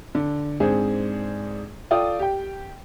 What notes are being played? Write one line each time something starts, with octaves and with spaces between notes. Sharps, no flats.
D3
G#2 C4 D4 G#4
F4 A4 D5 G5 D#6
G4 G5